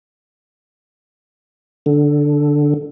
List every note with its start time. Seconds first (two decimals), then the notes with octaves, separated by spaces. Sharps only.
1.86 D3